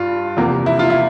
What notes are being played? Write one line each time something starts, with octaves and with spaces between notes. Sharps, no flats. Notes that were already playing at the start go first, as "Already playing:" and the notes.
Already playing: G2 F4
E2 C3 F3 A#3
E4
F4
E4